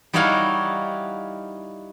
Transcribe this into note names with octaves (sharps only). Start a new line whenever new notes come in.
G3 D#4 E4 F#4 C#5 F5